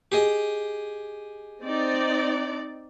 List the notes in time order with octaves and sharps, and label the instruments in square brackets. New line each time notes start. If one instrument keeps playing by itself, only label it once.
[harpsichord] G4 G#4 D#5
[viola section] C4 D#4 D5